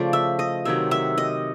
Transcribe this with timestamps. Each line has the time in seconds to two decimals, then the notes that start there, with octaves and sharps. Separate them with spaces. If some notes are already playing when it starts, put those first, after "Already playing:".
Already playing: C#3 F3 A3 D5
0.13 E5
0.39 D#5
0.65 C3 D#3 F#3 E5
0.91 E5
1.18 D#5